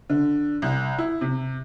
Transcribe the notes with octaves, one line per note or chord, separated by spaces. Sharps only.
D3
C2
E4
C3